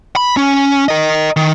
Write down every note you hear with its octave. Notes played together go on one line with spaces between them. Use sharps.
B5
C#4
A#4 D#5
D#3